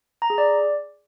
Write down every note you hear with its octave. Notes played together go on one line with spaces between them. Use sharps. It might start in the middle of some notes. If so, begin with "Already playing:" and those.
A#5
G#4
D5